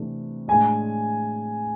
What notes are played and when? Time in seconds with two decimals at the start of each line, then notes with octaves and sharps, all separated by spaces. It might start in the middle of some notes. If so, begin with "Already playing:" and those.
Already playing: C3 E3 A3 D4
0.48 A2 G#3 D4 G#5